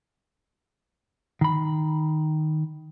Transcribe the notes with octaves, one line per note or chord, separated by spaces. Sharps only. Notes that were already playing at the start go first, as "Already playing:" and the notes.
D#3 B5